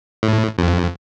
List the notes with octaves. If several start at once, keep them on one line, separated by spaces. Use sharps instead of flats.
A2
F2